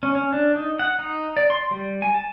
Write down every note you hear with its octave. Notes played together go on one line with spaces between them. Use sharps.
C#4
C#4
D4
D#4
F#5
D#4
D5
C6
G3
G#5
A5